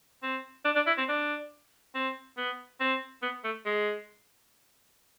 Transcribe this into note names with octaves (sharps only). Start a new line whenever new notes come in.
C4
D4
D4
E4
C4
D4
C4
B3
C4
B3
A3
G#3